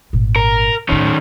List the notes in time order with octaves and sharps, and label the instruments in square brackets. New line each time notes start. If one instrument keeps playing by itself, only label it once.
[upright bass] G#1 A#2
[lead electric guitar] A#4
[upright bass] D#2 A2 [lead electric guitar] D#3 C#4